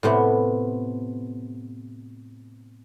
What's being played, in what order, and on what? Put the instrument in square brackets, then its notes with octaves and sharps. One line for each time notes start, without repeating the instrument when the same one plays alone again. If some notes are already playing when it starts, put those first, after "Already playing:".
[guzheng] A2 C3 B3